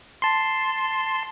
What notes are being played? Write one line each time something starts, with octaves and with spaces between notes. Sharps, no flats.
A5 C6